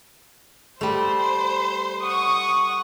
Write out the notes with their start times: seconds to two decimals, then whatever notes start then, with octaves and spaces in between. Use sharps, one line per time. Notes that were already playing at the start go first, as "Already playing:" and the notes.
0.81 G3 A3 C5
2.04 F#5 C#6 D#6